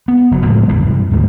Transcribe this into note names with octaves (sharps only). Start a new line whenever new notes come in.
B3
F#1 F#3
F2 A2 G#3
A#1 F2 D3
G2 C3
D2 G#2 B2 A3